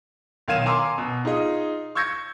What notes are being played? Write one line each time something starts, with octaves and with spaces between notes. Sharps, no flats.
B1 D#3 F5 G#6 D#7 E7
F5 G#5 A#5 C6 D6 E6
B2
D#4 F4 G#4 D#5
C#6 E6 G6 G#6 A#6 C#7